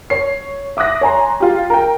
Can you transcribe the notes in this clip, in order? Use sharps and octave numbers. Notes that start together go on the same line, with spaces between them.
C#5 C7
E5 D6 D#6 F#6 A#6
C#5 G#5 A#5 C6
F4 G4
A#4 G5